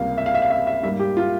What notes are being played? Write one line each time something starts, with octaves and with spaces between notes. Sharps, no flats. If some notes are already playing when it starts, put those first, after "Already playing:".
Already playing: C#2 C3 G3 A#3 F5
E5
F5
E5
F5
E5
E5
G#2 G3 A#3 E5
G4
F4